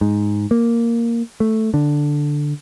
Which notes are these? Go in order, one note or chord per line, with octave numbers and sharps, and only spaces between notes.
G#2
A#3
A3
D3